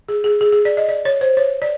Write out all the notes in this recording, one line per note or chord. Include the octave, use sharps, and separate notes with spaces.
G#4
G#4
G#4
G#4
D5
D#5
D5
C#5
C5
C#5
D5